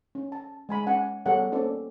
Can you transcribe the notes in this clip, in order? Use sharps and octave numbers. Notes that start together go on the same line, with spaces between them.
C#4
A5
G#3 G#5 B5
C#4 F#5 G#5
G3 B3 G#4 A4 C#5 F#5
A#3 C4 C#4 A4 D5